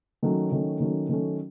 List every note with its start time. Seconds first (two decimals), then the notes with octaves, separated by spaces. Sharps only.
0.23 D#3 F#3 A3 C#4
0.52 D#3 F#3 A3 C#4
0.80 D#3 F#3 A3 C#4
1.09 D#3 F#3 A3 C#4